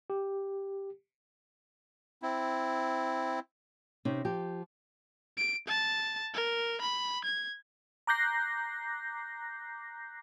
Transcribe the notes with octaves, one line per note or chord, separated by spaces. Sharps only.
G4
C4 E4
C3 C#4 D#4
F3 G4
D7
A5
A#4
B5
G#6
A#5 D6 F#6 G6 A#6 C7